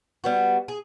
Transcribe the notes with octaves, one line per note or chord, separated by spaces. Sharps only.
G3 B3 F#4
G#4